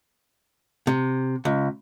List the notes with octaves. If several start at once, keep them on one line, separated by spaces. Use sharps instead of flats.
C3
C#2